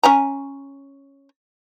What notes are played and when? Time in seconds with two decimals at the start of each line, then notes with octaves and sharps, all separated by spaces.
0.03 C#4 G#5 A#5